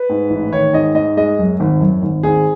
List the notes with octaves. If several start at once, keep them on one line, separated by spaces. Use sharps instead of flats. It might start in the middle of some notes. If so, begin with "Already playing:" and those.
Already playing: B4
G#2
A1
D#3 C#5
G#2 D#5
G#2 D#5
G#3 D#5
F#2
G#1
F#2
G#1
G#1 G#4